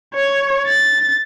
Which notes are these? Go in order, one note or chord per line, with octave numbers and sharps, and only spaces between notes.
C#5
A6